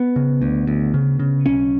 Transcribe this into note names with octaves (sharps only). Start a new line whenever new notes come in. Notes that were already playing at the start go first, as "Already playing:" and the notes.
Already playing: B3
C#3
D2
D2
C#3
C#3
B1 C#4